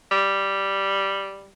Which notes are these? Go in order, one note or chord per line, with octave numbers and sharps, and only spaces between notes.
G3